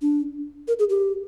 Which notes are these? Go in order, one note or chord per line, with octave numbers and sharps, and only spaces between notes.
D4
A#4
G#4
G4